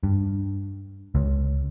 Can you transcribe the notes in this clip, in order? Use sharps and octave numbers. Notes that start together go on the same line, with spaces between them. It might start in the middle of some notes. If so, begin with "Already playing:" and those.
G2
C#2